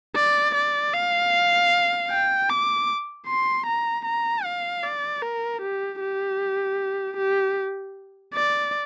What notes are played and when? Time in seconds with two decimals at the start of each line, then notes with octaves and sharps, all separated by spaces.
0.16 D5
0.55 D5
0.94 F5
2.11 G5
2.49 D6
3.28 C6
3.66 A#5
4.05 A#5
4.45 F5
4.83 D5
5.22 A#4
5.62 G4
6.01 G4
7.17 G4
8.34 D5